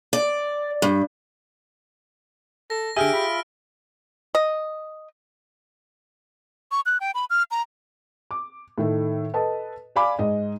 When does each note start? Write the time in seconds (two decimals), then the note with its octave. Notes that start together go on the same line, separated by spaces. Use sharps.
0.13 D5
0.82 G2
2.70 A4 A#6
2.96 D3 G4 G#4 E5 G#5 E6 F6 D7
3.13 F4 B5
4.35 D#5
6.71 C#6
6.86 F#6
7.00 G5
7.14 B5
7.30 F6
7.51 A#5
8.31 D6
8.78 A2 D#3 A3
9.34 A4 B4 D#5 A5
9.96 D5 F5 G#5 B5 D6
10.19 G#2 G#3 D#5